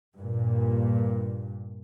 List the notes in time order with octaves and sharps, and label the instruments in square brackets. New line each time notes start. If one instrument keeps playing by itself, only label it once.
[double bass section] G2 A#2